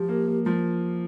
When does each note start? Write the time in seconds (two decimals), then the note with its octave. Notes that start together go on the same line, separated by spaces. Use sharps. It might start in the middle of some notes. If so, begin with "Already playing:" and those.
Already playing: F3 G4
0.09 A#3
0.27 A#3
0.45 F3 F4